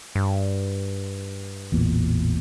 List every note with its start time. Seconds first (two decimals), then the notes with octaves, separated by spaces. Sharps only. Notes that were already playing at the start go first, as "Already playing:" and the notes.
0.15 G2
1.72 A1 E2 A#2